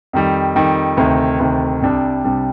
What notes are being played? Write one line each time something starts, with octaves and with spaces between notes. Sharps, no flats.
F2 D#3 G3
F2 D#3 G3
D2 C3 D#3
D2 C3 D#3
C2 C3 G3 D4
C2 C3 G3 D4